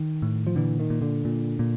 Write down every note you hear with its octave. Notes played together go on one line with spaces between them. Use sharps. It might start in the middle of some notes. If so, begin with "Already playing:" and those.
Already playing: D#3
A2
F3
A#2 D3 E3
D#3
A#2
D3
A#2
A#2